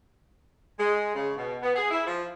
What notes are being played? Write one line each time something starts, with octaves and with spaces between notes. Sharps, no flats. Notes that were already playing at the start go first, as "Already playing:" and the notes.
G#3
C#3
B2
B3
G#4
E4
F3